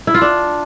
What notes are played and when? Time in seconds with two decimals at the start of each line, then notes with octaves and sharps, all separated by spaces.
0.07 E4
0.14 F4
0.22 D4